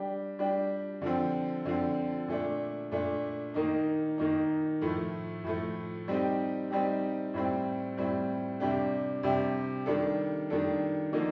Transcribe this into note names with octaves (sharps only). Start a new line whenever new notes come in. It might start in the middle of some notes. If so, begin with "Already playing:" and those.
Already playing: G3 D4 G4
G3 D4 G4
D3 F3 C4
D3 F3 C4
A#2 A3 D4
A#2 A3 D4
D#3 A#3 D#4
D#3 A#3 D#4
A2 F3 A3
A2 F3 A3
G3 C4 D#4 G4
G3 C4 D#4 G4
A2 G3 C4
A2 G3 C4
C3 G3 D4 G4
C3 G3 D4 G4
D#3 G3 D4 A4
D#3 G3 D4 A4
D3 F3 A#3 D#4